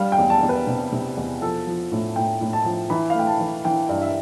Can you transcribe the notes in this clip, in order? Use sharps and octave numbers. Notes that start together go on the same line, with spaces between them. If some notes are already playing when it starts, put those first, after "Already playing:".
Already playing: G3 F5
G5
E2
A5
E2
B4
C3
C3
E2
F3 A4
F3
A2
A2 G5
A2
A5
F3
E3 B5
F5
A3 G5
A5
E3
E3 G5
G2
E5